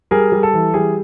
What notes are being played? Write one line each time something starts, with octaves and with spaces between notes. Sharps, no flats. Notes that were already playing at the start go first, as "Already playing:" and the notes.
G3 G#4 A#4
G3
A4
E3
G3 G#4